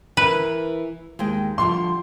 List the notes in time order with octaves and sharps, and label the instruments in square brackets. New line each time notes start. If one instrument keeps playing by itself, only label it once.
[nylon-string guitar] E3 A#4 [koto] B4
[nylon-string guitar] D#2 G#3 G5
[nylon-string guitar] D3 F3 G3 [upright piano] C6